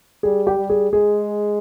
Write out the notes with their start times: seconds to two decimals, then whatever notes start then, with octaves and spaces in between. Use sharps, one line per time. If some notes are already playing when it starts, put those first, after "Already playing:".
0.23 G3 G#4
0.47 G4
0.58 G3
0.70 G#4
0.92 G#3 G#4